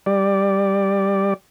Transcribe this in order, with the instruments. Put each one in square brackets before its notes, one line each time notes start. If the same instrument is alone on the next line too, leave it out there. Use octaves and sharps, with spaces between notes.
[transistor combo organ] G3 D5